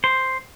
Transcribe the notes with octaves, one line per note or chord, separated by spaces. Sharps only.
C5